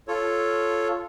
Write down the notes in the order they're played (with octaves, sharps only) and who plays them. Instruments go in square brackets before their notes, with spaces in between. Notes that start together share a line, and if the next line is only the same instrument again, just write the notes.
[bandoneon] F4 A4 C#5